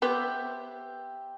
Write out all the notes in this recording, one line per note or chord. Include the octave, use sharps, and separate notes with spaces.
B3 G4 C5 E5